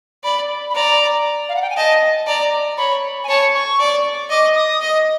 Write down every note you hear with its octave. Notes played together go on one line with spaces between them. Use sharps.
D5 B5
B5
D5 A#5
F5
F#5
G5
G#5
D#5 A5
D5 A#5
C#5 B5
G#5
C#5 A5
C#6
D5
D#5 D6
D#6
D#5